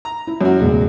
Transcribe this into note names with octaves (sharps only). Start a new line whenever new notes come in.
A#5
E4
F#2 C#4 F#4
E1 A1 C#3